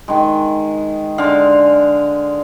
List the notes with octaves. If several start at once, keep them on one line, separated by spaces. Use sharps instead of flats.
D#3 G#3
D3 G#3 F5